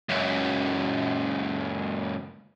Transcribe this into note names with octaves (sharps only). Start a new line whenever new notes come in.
C#2 F#2